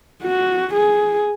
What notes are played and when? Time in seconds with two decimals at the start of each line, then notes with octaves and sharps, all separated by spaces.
0.23 F#4
0.74 G#4